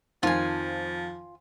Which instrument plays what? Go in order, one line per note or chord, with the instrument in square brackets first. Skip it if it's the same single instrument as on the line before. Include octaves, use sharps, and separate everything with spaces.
[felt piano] F2 D#3 [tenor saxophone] F3 [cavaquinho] F4 G#5